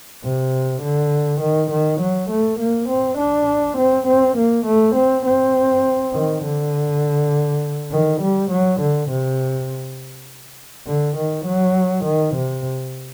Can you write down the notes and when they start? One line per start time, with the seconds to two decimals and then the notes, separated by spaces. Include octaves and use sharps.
0.23 C3
0.82 D3
1.41 D#3
1.71 D#3
2.00 F#3
2.30 A3
2.60 A#3
2.89 C4
3.18 D4
3.78 C4
4.07 C4
4.37 A#3
4.66 A3
4.96 C4
5.26 C4
6.13 D#3
6.44 D3
7.92 D#3
8.21 G3
8.50 F#3
8.80 D3
9.09 C3
10.87 D3
11.17 D#3
11.45 F#3
12.05 D#3
12.35 C3